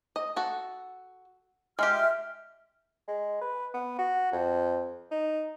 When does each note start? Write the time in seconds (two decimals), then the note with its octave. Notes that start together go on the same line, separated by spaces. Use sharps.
0.16 D#5
0.36 F#4 A4
1.79 G#3 F4 G4 E5 F6
3.08 G#3
3.41 B4
3.74 B3
3.98 F#4
4.32 F2
5.11 D#4